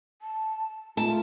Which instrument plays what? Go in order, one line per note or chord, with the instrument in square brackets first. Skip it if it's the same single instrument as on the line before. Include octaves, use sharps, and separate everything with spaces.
[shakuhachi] A5
[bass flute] A3 [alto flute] F4 [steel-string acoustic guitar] A5 [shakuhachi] A#5